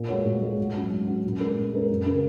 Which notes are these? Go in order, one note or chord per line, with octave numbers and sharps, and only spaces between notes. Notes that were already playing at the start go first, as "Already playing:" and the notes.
Already playing: A#2
G#3 F#4 C#5
A#2
G#3 F#4 C#5
G#2
F#3 C#4 F#4
G#2
F#3 C#4 F#4
A#2
G#3 C#4 A#4
A#2
G#3 C#4 A#4
F#2
C#3 A#3